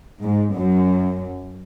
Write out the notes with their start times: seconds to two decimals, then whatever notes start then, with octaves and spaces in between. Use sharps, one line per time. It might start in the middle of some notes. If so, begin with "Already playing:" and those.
0.22 G#2
0.55 F#2